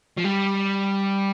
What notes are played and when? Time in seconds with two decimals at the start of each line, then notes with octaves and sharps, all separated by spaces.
0.18 F3
0.25 G3